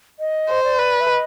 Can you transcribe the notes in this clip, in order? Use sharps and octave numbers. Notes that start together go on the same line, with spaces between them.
D#5
C5
D5
B4
E5
D#5